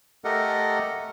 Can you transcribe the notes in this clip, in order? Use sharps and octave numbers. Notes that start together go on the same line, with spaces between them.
A3 G4 A4 A#4 D#5 F#5